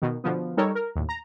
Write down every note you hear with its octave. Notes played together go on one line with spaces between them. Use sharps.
B2 D#3
B2 D3 F3 B3
G3 D#4 A4 A#4 C#5
A#4
D#2 A2
A#5